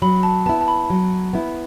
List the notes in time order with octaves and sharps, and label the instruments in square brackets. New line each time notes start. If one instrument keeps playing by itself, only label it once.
[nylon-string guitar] F#3 [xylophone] B5
[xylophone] A5
[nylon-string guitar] B3 [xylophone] A5
[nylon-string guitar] E4
[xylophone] A5
B5
[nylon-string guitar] F#3
B3 E4